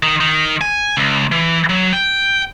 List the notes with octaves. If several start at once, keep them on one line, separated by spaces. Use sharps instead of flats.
D#3
D#3
G#5
C#2
E3
F#3
G5